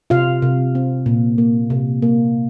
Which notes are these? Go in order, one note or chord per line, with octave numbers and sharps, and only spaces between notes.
C3 F4 F5
C3
C4
A#2
A#3
C3
A#3